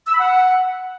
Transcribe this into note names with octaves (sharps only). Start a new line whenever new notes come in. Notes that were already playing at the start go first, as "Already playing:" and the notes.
E6
B5
F#5